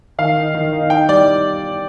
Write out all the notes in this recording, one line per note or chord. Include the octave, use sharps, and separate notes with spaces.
D#3 F5
D#4
D#3
D#4
D#4 G5
G3 D5